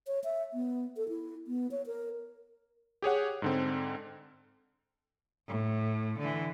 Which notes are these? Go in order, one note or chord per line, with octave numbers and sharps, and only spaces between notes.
C#5
E5
B3
A4
E4
B3
C#5
A#4
G4 G#4 C#5 F#5
G#2 D3 C4
A2
D3 E3